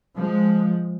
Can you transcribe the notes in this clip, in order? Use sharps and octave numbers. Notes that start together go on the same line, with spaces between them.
F3 G#3